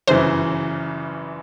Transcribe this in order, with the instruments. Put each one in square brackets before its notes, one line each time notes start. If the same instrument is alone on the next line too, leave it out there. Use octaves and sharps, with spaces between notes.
[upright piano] G1 F#2 C#3 E3 [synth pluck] C5